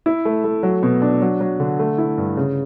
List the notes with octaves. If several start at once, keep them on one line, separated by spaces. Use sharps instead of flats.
E4
A3
A3
F#3
B2
D4
F#3
F#3
D3
A3
E4
G2
C#3